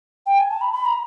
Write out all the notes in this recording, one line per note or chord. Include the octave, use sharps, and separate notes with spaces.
G5
G#5
A5
B5
B5
A#5